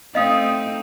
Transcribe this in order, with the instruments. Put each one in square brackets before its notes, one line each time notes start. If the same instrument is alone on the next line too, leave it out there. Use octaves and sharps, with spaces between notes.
[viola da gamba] A3 C4 D#4 [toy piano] D#5 F5 D#6